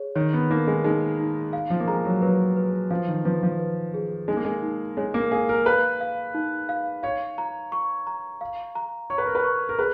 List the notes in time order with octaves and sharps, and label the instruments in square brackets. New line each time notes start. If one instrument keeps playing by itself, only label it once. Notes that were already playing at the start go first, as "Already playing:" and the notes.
Already playing: [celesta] G#4 C#5
[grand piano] D#3 [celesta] C#5
[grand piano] B3
[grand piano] A#3 [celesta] D#4
[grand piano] G#3
[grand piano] G#3 [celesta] D#4
[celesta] D#4
F5
[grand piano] F3
A#3
[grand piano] G#3 [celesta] A#5
[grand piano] F#3
[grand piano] F#3 [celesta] B4
[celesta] B4
[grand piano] F3 [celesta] F5
[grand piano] D#3
[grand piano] F3 [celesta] B4
[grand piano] F3
[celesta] B4
G#4
[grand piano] G#3 [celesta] D#4
[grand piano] A#3
G#3
[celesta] D#4
[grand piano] G#3 [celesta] C#5
[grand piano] A#3
[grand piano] G#4 [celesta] F5
[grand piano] A#4
[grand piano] B4 [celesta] F5
[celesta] F5
D#4
F5
[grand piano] C#5 [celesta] F5
[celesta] A#5
C#6
A#5
F5
A#5
[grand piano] C#5 [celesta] C#6
[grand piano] B4
A#4
B4
[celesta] C#6
[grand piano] A#4
[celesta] G#4 [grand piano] B4